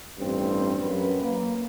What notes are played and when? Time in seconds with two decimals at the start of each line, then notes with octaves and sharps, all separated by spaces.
0.18 A1 G2 C4
0.79 F#2 F#3 B4
1.21 A#3